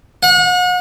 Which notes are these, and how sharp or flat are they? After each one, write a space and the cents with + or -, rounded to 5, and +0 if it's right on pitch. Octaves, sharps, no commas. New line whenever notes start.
F#5 -40